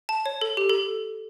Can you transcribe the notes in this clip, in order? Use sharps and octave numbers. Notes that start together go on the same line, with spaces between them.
A5
C#5
A4
G4
A4